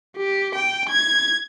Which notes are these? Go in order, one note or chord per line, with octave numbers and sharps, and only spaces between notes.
G4
G5
G#6